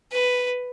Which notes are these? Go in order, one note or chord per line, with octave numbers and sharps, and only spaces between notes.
B4